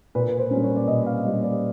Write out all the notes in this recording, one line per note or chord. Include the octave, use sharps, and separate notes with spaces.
A#2 B4
C5
G3 A#3 C#4
C#5
D5
A#2 D#5
F5
G3 A#3 C#4 D#5
D5